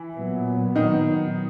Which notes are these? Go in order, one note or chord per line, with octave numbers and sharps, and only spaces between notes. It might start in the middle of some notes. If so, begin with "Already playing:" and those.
Already playing: E3 E4
A#2 F#3 B3
D#3 D#4